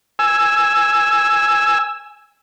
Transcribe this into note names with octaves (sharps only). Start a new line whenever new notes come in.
G#5 E6